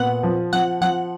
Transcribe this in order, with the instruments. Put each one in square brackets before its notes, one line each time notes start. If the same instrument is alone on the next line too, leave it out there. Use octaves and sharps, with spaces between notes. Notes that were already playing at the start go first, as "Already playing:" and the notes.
Already playing: [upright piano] A#2 B3 [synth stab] F#5
[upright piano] F3
[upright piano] F3 [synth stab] F#5
[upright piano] F3 [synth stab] F#5